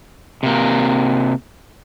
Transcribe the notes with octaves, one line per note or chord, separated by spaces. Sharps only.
C3 A#3